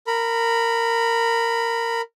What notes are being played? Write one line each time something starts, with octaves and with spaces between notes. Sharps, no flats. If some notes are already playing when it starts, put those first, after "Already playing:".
A#4 B5